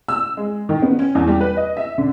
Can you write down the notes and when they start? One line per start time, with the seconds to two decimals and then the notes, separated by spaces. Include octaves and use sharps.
0.09 E6
0.37 G#3
0.69 D#3
0.82 B3
0.99 C#4
1.15 E2
1.27 G3
1.41 B4
1.57 D#5
1.77 E5
1.98 D3